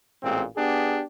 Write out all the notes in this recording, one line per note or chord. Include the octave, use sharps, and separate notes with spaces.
A1 A#2 G#3 C4
B3 D4 G4 G#4